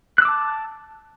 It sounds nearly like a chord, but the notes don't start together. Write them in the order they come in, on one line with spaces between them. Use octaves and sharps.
F#6 E6 D6 A5